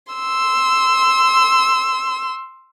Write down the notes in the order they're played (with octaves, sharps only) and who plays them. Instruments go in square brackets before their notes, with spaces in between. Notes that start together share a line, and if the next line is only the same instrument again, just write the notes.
[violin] C6 E6